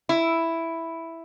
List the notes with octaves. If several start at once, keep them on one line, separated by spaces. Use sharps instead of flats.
E4